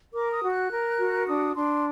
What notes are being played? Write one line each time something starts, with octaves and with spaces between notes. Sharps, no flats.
A#4 D6
D#6
F#4
F#6
A#4
F#4
D4 D#6
D4 C6